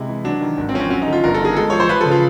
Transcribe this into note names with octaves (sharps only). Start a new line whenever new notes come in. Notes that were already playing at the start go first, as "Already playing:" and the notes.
Already playing: C3 G#3 E4
E3
F#3 D4
D#3
G#1
C4
F3 C#4
C4
F#3 C#4
D#4
D3
F4
G1 A#4
A4
D#3 G#4
G#3 A4
F3 C#5
C5
F3 B4
A4
C#3
F4